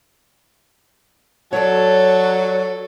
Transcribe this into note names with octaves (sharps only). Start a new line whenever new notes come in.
F#3 A4 C#5 D5